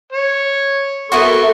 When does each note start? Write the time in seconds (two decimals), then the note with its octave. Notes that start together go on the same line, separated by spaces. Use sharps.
0.12 C#5
1.12 B3 E4 F#4 A4 A#4 C6 C#6